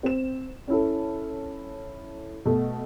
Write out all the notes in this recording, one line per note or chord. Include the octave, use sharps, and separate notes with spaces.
C4 E7
C#4 E4 A4
B2 A3